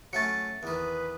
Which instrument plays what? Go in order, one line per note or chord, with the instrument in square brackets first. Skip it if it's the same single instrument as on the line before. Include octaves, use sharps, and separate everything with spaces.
[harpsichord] F#3 A3 C#4 [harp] A6 C#7
[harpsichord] E2 D#3 [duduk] B4